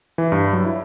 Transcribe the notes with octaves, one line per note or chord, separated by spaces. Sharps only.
E3
G2
F#3
E4